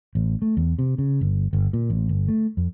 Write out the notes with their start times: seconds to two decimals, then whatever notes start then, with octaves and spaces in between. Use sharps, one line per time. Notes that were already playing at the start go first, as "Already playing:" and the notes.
0.15 A1
0.42 A3
0.57 E2
0.79 C3
0.98 C#3
1.21 G1
1.53 G1
1.73 A#2
1.90 A1
2.09 G1
2.28 A3
2.57 F2